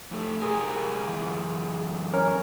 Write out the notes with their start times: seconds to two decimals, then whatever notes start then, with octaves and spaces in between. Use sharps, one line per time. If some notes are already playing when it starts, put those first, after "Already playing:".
0.11 F2 A3
0.42 C3 G4 G#4 A#4
1.08 F#2 E3
2.13 C#4 A#4 C#5